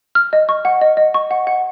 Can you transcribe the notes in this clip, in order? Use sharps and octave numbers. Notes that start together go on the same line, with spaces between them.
F6
D#5
C#6
F#5
D#5
D#5
C#6
F#5
F#5